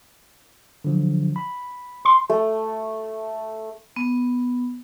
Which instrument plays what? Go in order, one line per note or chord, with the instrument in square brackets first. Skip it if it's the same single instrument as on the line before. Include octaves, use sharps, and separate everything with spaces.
[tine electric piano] D3 F3 F#3
B5
[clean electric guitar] C6
[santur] A3
[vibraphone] B3